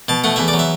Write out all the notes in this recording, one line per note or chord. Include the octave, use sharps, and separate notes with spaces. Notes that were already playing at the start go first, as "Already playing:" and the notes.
B2 A5
A3 F#5
E2 E5
D5
F#3
E5